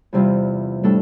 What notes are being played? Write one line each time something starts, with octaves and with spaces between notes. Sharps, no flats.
E2 C3 G3 C4 F4
A2 G3 D4 A4